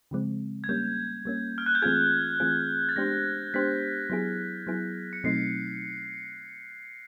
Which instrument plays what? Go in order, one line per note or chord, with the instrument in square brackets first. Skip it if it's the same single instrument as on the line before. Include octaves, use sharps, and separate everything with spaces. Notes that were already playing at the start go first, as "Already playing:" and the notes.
[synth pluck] C#3 F3 G#3 C4
[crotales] G#6
[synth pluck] G3 A#3 C#4 [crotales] G6
[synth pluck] G3 A#3 C#4
[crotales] F6
F#6
G6
[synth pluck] E3 A3 C4 F4 G#4 [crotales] G#6
[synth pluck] E3 A3 C4 F4 G#4
[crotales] A6
[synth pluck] G#3 B3 D4 G4 C5 [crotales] A#6
[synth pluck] G#3 B3 D4 G4 C5 [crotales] B6
[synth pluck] F#3 B3 E4 G#4
F#3 B3 E4 G#4
[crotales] C#7
[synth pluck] B2 F#3 A3 C4 D#4 [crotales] C7